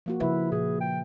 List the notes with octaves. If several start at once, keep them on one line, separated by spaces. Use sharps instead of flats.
F3 A#3 F#4
C#3 F3 E4 B4 E5
A#2 G#4
G5